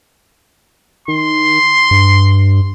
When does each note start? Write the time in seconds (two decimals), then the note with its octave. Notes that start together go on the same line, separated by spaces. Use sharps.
1.08 D#3 C6
1.91 G2